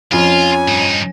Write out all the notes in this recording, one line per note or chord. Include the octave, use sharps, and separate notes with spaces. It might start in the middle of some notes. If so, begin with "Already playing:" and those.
F2 C#4 F4 G#5
G2 D#4